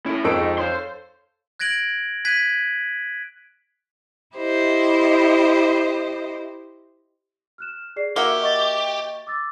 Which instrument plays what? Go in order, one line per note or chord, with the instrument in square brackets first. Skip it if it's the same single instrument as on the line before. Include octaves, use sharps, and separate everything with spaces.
[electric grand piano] C#4 [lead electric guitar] E4 A4
[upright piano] F2 [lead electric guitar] D#4 G#4 [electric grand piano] C#6 E6 D7
[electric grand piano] A4 C#5 F5 [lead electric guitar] C5 C6
[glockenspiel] F#6 G#6 A#6 D7 F#7
F#6 G#6 B6 D#7 F#7
[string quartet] E4 G4 C5 D#5
[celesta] F6 F#6 E7
G#4 D5 C7
[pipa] A#3 F#4 E5 [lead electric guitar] G4 [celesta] D6
[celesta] D#5 C#6 A6
D6 E6 A6